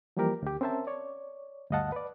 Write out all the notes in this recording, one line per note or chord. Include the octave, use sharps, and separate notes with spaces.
E3 F3 G3 A#3 G4 A#4
D2 G4
C4 C#4 A#4 C5 E5 A5
C#5 D5
D2 G2 D#5 F5 F#5 A5
B4 D5